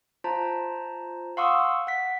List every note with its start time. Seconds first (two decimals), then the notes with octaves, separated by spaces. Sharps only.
0.24 F4 C5 A5 A#5
1.37 F5 F#5 C6 C#6 D#6 E6
1.87 F#5 B6